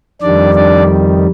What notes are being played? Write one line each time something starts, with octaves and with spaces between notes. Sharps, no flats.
F2 D#3 G3 D4 D5
D4 D5